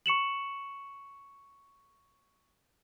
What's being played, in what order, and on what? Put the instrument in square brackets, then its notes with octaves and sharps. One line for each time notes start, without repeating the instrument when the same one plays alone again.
[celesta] C#6 C#7 E7 F#7